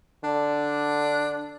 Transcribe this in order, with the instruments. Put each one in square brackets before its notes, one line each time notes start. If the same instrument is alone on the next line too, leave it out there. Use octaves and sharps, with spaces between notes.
[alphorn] D3 [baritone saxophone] D4